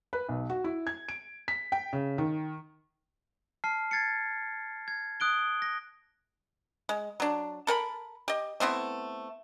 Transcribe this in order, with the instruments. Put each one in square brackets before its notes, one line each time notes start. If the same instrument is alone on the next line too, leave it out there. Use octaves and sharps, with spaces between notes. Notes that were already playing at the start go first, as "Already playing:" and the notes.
[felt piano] B4
B1
F#4
E4
G#6
D7
B6
G5
C#3
D#3
[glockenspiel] A5 F6 C7
G#6 A6 C7 C#7
G#6
D#6 F#6 D7 G7
A#6
[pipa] G#3
F#3 D4
A4 A#4 G5 B5
G4 D#5
A3 B3 C4 E4